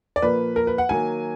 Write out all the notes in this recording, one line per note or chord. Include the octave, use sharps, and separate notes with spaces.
D5
A#2 F3 A#3 B4
A#4
B4
F#5
D#3 F#3 A#3 G#5